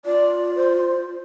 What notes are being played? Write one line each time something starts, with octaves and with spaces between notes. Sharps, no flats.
F4 D5
C5